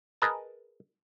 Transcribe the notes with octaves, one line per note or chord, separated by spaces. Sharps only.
G#4 A#4 B4 D#5 A5